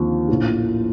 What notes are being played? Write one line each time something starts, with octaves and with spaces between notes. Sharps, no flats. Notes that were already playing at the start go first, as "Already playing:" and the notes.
Already playing: D#2 D3 F3 C4
A#1 A2 F3